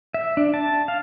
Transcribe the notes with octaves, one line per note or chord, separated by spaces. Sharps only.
E5
D4
A5
F5